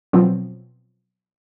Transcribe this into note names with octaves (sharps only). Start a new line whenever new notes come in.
B2 F3 F#3 B3 C4